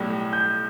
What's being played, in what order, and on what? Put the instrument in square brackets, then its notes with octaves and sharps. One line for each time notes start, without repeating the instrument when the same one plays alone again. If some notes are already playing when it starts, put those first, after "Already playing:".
Already playing: [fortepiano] B1 A2 G3
[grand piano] G6